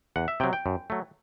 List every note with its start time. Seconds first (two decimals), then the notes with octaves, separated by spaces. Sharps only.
0.16 E2 F#5
0.28 E5
0.40 C3 F#3 G5
0.53 G5
0.66 F#2
0.90 F#3 A3